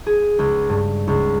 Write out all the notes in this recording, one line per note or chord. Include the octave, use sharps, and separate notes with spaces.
G#4
C#2
G2
C#2